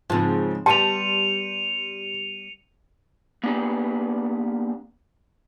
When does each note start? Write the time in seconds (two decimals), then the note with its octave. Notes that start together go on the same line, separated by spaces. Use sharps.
0.10 G#2 C#3 F3 C4
0.66 G3 B3 G4 A5 C6 C#7 D#7 F7
3.44 A#3 B3 D4 G4 G#4 B4